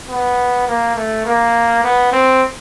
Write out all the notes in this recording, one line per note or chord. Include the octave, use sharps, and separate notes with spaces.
B3
A#3
A3
A#3
B3
C4